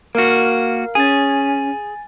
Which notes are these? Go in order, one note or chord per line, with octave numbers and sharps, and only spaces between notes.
A#3 F#4 A#4 F5
C#4 G#4 G#5 A6